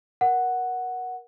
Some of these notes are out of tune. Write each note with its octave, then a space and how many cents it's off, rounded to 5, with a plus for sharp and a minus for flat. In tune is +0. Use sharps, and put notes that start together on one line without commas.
A#4 +25 F#5 +0